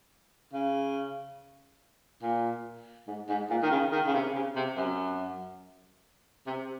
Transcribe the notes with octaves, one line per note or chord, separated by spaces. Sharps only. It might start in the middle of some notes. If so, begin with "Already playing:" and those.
C#3
A#2
G#2
G#2
A#2
D#3
C#3
D#3
C#3
C3
C#3
C3
F#2
C3